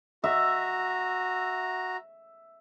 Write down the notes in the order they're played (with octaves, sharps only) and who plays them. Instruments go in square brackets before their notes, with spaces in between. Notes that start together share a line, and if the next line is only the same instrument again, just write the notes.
[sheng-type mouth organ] F#4 A#5 [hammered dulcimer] E5